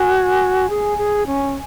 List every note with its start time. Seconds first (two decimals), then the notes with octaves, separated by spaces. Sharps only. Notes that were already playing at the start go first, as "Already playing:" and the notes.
Already playing: F#4 G#5
0.70 G#4
0.98 G#4
1.27 C#4